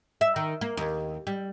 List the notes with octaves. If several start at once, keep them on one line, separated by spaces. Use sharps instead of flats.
E5
D#3
A#3
D#2
G3